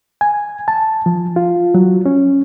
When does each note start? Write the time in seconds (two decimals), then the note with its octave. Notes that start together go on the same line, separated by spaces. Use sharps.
0.21 G#5
0.68 A5
1.06 F3
1.36 F4
1.74 F#3
2.06 C#4